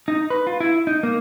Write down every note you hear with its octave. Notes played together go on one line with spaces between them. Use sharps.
D#4
B4
F4
E4
D#4
A#3